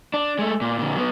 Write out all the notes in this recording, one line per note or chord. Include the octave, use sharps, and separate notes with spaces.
D4
G#3 A3
A#2
A#2 D3
F#3 B3